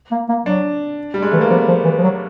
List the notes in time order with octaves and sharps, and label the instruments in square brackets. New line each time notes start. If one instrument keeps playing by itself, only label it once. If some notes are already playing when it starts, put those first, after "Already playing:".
[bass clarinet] A#3
A#3
[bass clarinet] F#3 [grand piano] D4
[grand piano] G3
G#3
[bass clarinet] E3 [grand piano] A3
[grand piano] A#3
[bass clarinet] F3 [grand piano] B3
[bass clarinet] F3
E3
F3
F#3